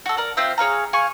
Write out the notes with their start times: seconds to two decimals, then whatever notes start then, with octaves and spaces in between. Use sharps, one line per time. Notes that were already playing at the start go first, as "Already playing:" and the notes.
0.06 F#4 A4
0.17 A#4 D5
0.37 C4 F4 C5 E5
0.58 G#4 C#5 F5 A#5
0.93 G#4 F5 G#5 C#6